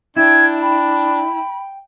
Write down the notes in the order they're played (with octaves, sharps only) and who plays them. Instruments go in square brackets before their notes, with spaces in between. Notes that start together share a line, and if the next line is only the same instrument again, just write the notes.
[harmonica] D4 [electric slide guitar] E4 [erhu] G5 [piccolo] G#6
[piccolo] G5 [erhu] B5